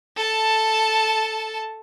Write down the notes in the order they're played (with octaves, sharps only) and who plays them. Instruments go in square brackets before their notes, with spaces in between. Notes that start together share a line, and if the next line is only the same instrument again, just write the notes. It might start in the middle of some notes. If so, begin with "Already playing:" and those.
[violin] A4 A5